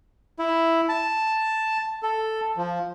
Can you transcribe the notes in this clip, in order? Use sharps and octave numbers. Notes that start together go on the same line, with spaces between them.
E4
A5
A4
F3